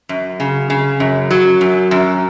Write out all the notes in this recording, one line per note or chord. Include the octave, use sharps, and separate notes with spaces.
F#2
C#3
C#3
F#2
F#3
F#2
F#2